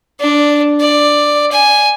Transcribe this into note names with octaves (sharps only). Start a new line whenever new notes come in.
D4
D5
G#5